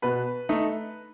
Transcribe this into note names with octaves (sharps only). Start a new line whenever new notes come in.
B2 B4 B5
A3 D#4